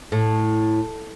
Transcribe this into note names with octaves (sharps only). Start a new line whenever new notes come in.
A2